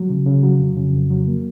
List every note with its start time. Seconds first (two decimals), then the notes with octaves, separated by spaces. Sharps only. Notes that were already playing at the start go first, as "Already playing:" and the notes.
Already playing: F#3
0.09 C#3
0.26 C#3
0.43 F#3
0.60 F2
0.77 C#3
0.94 F2
1.10 F#3
1.27 A#3